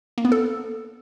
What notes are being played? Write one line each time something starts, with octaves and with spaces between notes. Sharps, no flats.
A#3
B3
A4